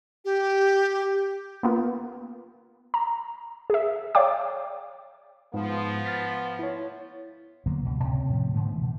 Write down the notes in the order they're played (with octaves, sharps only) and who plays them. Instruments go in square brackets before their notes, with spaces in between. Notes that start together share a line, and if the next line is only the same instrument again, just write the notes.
[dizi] G4
[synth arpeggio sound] A#3 B3 F4
A#5
G#4 E5
C#5 D5 F5 G5 D6
[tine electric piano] G#2 [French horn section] F3 B3
[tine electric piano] F6 A6 B6
E4 C#5
[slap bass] D3 F#3 A#3 B3
C#2 G2 B2
A2 C3 C4 C#4
A2 C3 F3 A3
G#2 D3 A3 B3
B2 E3